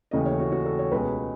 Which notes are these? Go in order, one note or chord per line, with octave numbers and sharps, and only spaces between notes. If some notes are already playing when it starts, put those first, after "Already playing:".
D#2 C#3 E3 A3 D#5
C#5
F#4
F#4
A4
C#5
C#2 B2 G#3 B4